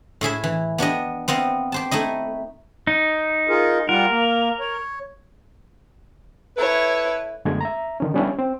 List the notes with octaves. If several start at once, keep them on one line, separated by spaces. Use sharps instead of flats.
A2 E4 G#4 E5
E3
B3 D4 G4 D#5
B3 C4 D#5 F5
G4 C5 A5
A3 D#4 E4 D#5
D#4
F4 G#4 A#4
G3 F4 A#4 F#5
A#3
C#5
E4 A4 B4 C#5
F#2 D3 G#3 A3 B3 G#6
E5 A#5
D3 D#3 C#4
G3 B3 C#4 D4 E4
C4